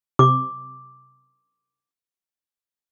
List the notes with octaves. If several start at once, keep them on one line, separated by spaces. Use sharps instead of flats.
C3 D6